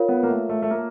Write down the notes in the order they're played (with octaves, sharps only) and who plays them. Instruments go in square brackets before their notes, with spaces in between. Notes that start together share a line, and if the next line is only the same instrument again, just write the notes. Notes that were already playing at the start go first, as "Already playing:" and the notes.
Already playing: [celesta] F4 A#4 C#5 F5
[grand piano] B3
A#3
A3
A3
A3
A#3